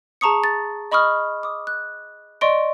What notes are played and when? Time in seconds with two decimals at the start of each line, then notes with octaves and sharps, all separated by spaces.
0.21 G#4 A5 A#5 C#6 D#6 C#7
0.44 A6
0.92 D#5 B5 C#6 D#6 F6
1.43 D6 D#6
1.67 F#6
2.41 D5 D#5 C6 C#6 D7